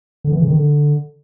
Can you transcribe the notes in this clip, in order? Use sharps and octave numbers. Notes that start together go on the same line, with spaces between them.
D3
E3
C#3
D#3
D3